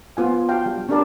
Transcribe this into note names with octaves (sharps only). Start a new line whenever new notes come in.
B3 F4 G#5
F#4 F5 G5 A5
G3
C#4 D4 G4 A#4 D5 A5